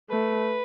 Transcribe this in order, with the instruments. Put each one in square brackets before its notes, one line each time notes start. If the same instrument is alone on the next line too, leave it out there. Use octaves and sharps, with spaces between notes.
[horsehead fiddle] A3 [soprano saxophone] B4